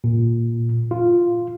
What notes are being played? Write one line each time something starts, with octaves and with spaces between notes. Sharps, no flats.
A#2
F4